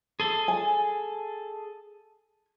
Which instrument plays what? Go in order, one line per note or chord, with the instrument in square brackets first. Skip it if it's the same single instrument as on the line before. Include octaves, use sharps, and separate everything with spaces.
[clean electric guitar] G#4 A4
[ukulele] G#5